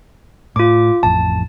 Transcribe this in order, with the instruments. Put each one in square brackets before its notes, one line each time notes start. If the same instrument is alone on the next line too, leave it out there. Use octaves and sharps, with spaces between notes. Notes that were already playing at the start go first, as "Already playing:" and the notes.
[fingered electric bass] A2 [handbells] F4 D6
[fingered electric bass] A1 F2 [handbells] A5